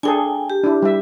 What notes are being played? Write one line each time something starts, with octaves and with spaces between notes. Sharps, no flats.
D4 G#4 A4 G5 G#5
G4
D4 E4
G3 E5